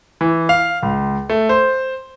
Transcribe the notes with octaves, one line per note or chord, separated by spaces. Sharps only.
E3
F5
C#2
A3
C5